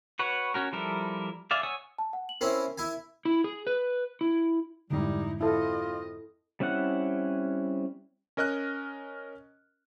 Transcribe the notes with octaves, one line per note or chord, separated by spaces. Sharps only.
F#4 B4 C#5 F#5
C#4 F#4 A#4
F3 G3 E4 A4 A#4
G#4 D5 E5 F5
C#5 F#5 G#5 D#6 E6
A5
F#5
F#7
C4 C#4 E4 A#4
E4 G#5
E4
G#4
B4
E4
F2 G#2 D3 G3 D#4 E4
C4 E4 F4 A4 D#5
G3 C4 C#4 E4 F#5
C#4 A#4 D#5 F6 F#6